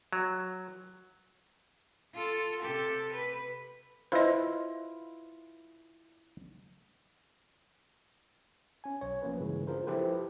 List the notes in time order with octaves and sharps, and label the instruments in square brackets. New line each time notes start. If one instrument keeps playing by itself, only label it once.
[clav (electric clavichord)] F#3
[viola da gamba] F4 A4
C3 G4 A4
B4
[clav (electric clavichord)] E4 F4 B4 [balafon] C5 D#5
[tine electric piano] C#4 G#5
B1 C#5
F3 A#3 C#4 B4
G2 C#3 E3 G#3
D4 F4 G#4 A#4 C5
F3 E4 G4 A4 B4 C5